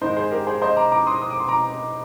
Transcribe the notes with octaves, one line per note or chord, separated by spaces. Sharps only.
G#2 D#3 G#3 C5 D#5
G#4 C5
G4 A#4
G#4 C5
C5 D#5
A#5 D6
A#5 D6
C6 D#6
D#6
D6
C6
A#5 D6